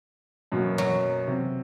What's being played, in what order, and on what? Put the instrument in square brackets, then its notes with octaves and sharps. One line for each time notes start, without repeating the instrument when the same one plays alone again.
[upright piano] F#2 B2 A#3
[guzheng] F#3
[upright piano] C3